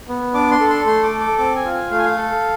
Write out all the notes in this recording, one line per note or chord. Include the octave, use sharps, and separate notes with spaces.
B3
D4 D6
C6
A4
C6
A3 C6
D6
A4
D6
C4 D6
G#5
F4
G#5
A3 F5
G#5
F5
A4